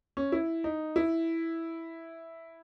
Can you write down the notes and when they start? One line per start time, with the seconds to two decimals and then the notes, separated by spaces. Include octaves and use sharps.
0.17 C#4
0.32 E4
0.64 D#4
0.96 E4